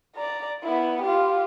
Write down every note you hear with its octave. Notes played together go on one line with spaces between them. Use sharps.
D5 A#5
B3 E4
F4 G4